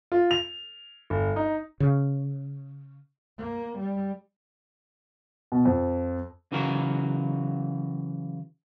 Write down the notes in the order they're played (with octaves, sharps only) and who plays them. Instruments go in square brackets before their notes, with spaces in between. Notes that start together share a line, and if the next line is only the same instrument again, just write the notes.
[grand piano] F4
F7
G1
D#4
[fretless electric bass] C#3
[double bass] A#3
G3
[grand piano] B2
F2
[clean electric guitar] C#3 E3 F#3 F#4 A#4